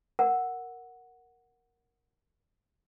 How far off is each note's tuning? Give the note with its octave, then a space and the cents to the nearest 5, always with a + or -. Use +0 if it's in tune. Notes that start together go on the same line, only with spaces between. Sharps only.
A#4 +0 F#5 +0